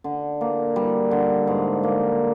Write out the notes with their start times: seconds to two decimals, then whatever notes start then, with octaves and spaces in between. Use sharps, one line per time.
0.04 D3
0.41 A#3
0.76 G3
1.11 D3
1.47 G#2
1.83 A#3